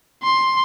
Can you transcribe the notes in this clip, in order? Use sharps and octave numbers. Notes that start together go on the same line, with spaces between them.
C6